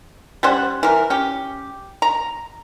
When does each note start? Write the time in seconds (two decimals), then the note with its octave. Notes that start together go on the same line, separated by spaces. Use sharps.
0.43 G3 C#4 C5 F#5
0.83 E3 A#4
1.10 C#4 G4
2.02 A#5